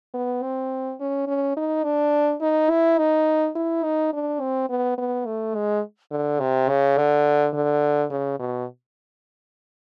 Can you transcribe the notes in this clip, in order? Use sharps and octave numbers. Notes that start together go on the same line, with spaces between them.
B3
C4
C#4
C#4
D#4
D4
D#4
E4
D#4
E4
D#4
D4
C4
B3
B3
A3
G#3
D3
C3
C#3
D3
D3
C#3
B2